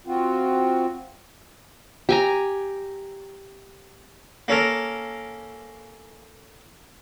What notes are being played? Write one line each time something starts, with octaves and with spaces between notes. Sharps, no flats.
C4 F4 F#4
G4 G#5 A#5
A#3 C#4 A4 A#4